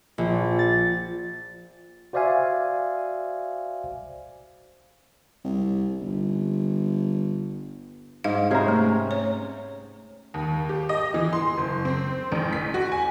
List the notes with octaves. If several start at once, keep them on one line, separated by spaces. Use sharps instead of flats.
A#1
A6
F#4 C5 D5 E5 F5 G#5
C2
G1
G#2 F5
C3 C#4 G#4 C5 A#5
A3
C#5
D#2
G4
D#5
E3
C6
F#1
C4
A1
B6
F#4
G#5